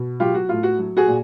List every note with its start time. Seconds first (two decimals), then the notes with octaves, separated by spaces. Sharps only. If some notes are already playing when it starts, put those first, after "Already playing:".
Already playing: B2
0.20 F#3 F4 G4
0.35 F#4
0.49 A2 F4
0.63 F#4
0.78 F#3
0.97 F#4 G#4
1.07 A#2